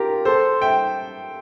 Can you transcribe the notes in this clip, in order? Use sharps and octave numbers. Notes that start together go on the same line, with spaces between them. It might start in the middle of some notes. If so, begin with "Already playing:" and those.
Already playing: F4 G4 A#4
A4 C5
E5 G5